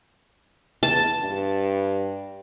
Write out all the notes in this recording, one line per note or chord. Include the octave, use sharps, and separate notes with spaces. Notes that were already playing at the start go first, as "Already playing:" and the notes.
E2 A5
G2